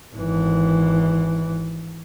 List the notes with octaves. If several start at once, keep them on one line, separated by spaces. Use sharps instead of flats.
G#1 E3